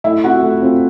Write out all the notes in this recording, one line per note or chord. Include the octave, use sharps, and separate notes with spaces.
A3 E4 E5
C4 F4 F#4 F#5
A3
C4 F4